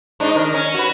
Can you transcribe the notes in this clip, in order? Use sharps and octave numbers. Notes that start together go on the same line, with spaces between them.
G#2 D4 D#4
D#3 A#4
C#4
F#4 B4